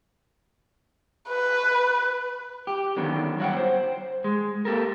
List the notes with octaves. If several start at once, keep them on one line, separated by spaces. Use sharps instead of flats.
B4
G4
D3 D#3 F#3 B3 C#4
G2 F#3 C#5 E5 F#5 G5
C5
G#3
A#3 G4 A4 A#4